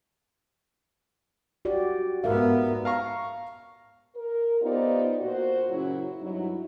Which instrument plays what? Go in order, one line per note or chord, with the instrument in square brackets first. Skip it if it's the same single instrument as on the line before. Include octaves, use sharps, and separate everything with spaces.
[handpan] F#4 G4 D5
[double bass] G#2 B3 [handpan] A#4 E5 F5
[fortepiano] F5 A#5 C#6
[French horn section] A#4
B3 D#4 F4 G4 C5 D5
A#2 F#4 C5
F#2 C#3 F#3 E4
G2 F#3 D#4 E4